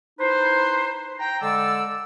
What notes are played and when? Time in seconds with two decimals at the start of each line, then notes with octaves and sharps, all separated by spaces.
0.19 D#4 E4 B4 C5
1.19 G5 A#5
1.41 D3 G#3 A4 D5 E6